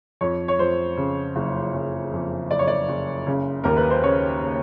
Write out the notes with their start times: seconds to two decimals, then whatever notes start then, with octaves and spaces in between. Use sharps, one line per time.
0.21 F2 C#5
0.48 C#5
0.59 F2 C5
0.97 C#3
1.36 F#1
1.74 F#1
2.12 F2
2.51 F#1 D5
2.59 C#5
2.68 D5
2.88 F#1
3.27 C#3
3.64 D#2 A#4
3.77 B4
3.90 C5
4.04 C#3 C#5
4.42 C#3